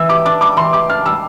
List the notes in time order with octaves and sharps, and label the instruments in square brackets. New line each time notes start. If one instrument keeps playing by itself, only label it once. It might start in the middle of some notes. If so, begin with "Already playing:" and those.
Already playing: [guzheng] E3 [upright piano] E6
[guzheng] G4 [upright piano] D6
[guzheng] D4 [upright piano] D6
[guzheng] G3 [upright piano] D6
[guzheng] E3 [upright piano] C6
[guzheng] G4 [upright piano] D6
[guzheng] D4 [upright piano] F6
[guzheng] G3 [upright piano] E6